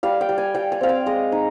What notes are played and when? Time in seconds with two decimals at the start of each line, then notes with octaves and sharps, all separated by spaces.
0.03 G3 F5
0.21 G5
0.29 G3
0.38 G#5
0.54 G3 G5
0.72 G#5
0.81 C4 F5
0.89 G5
1.06 G#3 D#5
1.32 D#4